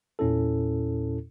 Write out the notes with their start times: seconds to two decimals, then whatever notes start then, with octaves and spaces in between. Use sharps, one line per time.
0.19 E2 A#2 C#4 E4 A4